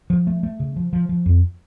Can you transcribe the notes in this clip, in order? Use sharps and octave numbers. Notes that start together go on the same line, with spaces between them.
F3
A3
A3
C#3
F3
F3
F3
F2